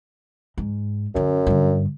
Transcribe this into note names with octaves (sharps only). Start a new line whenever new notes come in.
G#2
F#2 D3 C#4
G2 D3